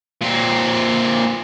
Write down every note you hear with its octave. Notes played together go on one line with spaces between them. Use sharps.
A#2 C4